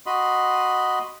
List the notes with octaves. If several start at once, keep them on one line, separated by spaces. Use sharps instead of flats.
F#4 D#5 B5 C6